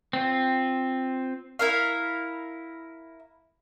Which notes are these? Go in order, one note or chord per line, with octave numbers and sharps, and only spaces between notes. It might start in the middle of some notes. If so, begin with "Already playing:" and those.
C4 F4
E4 A#4 F5